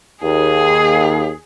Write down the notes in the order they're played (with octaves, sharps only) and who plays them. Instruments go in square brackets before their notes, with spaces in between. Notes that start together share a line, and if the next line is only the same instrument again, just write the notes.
[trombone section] D#2 [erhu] G#4